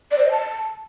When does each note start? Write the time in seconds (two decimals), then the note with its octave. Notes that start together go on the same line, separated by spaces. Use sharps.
0.11 D5
0.18 C5
0.25 D#5
0.31 A5